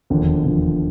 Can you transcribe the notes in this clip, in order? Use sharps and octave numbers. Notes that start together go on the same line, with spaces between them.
E1 D#2 D3 F3
E1 D#2 D3 F3